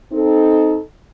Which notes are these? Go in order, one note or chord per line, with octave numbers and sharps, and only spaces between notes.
C4 D#4 A4